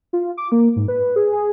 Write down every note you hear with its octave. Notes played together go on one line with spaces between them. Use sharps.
F4
D6
A#3
G#2
B4
G#4
G#4